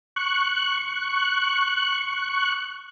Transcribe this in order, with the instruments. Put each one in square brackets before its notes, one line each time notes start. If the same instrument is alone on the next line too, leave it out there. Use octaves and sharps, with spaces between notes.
[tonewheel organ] C#6 F#6